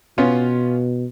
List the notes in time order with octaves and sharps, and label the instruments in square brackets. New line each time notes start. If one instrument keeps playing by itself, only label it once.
[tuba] B2 [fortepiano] B3 C#4 F4